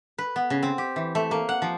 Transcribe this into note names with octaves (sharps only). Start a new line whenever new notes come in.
B4
B3
C#3
C4
G4
E3
A3
A#3
F#5
F3